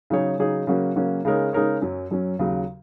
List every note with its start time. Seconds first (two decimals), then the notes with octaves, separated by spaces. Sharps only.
0.10 C#3 F#3 D#4 G#4 C#5
0.39 C#3 F#3 D#4 G#4 C#5
0.67 C#3 F#3 A#3 C#4 F#4
0.96 C#3 F#3 A#3 C#4 F#4
1.25 C#3 G#3 D#4 A#4 C#5
1.53 C#3 G#3 D#4 A#4 C#5
1.82 F#2 F#3 C#4
2.11 F#2 F#3 C#4
2.39 D#2 C#3 F#3